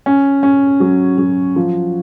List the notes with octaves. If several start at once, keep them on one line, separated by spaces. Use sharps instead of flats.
C#4
C#4
F#3
F#3
F3